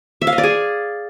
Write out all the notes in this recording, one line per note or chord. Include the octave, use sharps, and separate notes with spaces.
E5
F5
D#5
D5
G#4